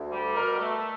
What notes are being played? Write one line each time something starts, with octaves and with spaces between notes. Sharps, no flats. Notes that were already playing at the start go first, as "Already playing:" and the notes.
Already playing: D2
G3
B2 A#4
A3